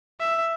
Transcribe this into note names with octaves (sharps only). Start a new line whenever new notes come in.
E5